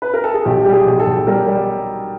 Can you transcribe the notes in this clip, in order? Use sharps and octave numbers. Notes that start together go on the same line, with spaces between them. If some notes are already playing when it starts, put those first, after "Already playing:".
B4
A#4
A4
G#4
B1 G4
G3 G4
G#4
B1
A4
B1
G3 A#4
G3